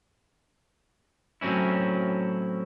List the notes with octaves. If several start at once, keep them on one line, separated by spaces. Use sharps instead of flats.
A2 F#3 C4 C#4 E4